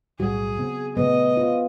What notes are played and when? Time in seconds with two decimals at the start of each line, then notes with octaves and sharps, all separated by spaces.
0.20 B1 A2 G3 F#4 G#4
0.59 C#3 B3 C4
0.97 A#2 C#3 A3 B3 B4 D#5
1.37 F4